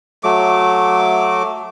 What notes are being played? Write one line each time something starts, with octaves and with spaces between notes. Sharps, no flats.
F#3 A3 D6